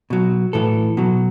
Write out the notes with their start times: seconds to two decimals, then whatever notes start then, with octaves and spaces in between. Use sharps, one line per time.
0.10 B2 F#3
0.53 A2 E3 A4
0.97 B2 F#3